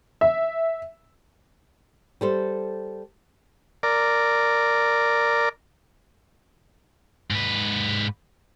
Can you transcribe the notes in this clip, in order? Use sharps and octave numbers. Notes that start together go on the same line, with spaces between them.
E5
G3 A4 C5
A#4 D5
G#2 B4